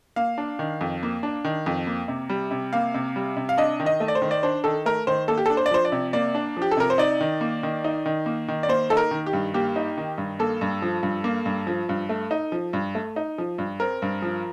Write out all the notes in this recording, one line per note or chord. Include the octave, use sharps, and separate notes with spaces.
A#3 F5
D4
D#3
F2
A#3
D4
D#3
F2
A#3
C3
G3
C3
A#3 F5
C3
G3
C3
F5
D4 D#5
D#3
D#5
A3
D5
C5
D#3
D5
D4 C5
D#3 A4
A3 A#4
D#3 C5
A#3 A4
G4
A4
D4
C5
D5
F3 C5
D5
C3
A#3 D5
D4
F3 G4
A4
C3 A#4
C5
D#4 D5
D#3
A#3
D#3
D#4
D#3
A#3
D#3
D5
A#3 C5
D#4 A4
A#4
D#3
G4
G2
A#3 G4
D#4
D#3
G2
A#3 A4
G2
F3
G2
A#3
G2
F3
G2
A3
D#4
F3
G2
A3
D#4
F3
G2
C4 A#4
G2
F3